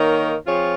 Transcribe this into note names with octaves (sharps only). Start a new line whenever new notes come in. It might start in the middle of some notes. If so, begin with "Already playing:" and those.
Already playing: D#3 A#3 D#4 A#4 C#5
F3 C4 F4 G#4 C#5